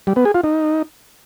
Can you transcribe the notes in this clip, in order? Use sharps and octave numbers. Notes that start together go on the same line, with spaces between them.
G3
B3
G#4
F4
D#4